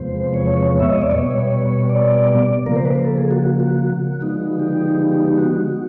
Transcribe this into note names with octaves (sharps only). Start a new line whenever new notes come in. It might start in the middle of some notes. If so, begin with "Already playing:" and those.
Already playing: E2 C3 F3 G#3 B3 C5
C#5
E5
D#5
D5
B2 G3 B3 C#5
D5
C#3 F3 A#3 A#4
C5
B4
A#4
A4
G#4
F#4
F#4
F#4
D3 F3 G#3 B3 D#4
G4
F#4